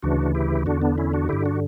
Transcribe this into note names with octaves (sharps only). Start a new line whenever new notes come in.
D2 C#3 E3 D4 F#4
E4 G4
E2 D3 D4 F#4
B3 D4
C#4 E4
D4 F#4
G2 D3 E4 G4
D4 F#4